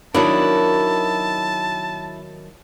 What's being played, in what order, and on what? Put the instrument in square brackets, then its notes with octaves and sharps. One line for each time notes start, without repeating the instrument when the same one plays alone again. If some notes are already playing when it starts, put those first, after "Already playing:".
[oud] D#3 F#3 B3 [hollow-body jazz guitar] D4 E4 [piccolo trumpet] A5